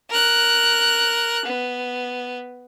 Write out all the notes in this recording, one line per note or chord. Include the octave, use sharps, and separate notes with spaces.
A#4 F#6
B3